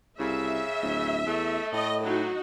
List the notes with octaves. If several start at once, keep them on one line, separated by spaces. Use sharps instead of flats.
C2 C#3 E5
D1
E2 A3
A2 D#5
F#3 D#4 F#4